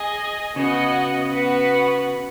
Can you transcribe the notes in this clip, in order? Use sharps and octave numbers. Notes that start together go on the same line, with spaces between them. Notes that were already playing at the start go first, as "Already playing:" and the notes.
Already playing: G#4 D#5 G#5
C#3 B3 F#4 D#5 F#5
B3 F#4 B4 F#5